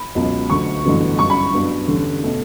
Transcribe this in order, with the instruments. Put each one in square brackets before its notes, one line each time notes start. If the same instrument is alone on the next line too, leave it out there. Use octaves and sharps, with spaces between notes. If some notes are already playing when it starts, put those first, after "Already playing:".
Already playing: [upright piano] B5
C#2 B2 F#3 C#4
D2 D3 F#3 C#6
A1 G2 D3 F#3 B3
G2 F#3 C#4 C#6
B5
G2 F#3 B3 D4
E2 D3 G3 C#4
B2 A3 C#4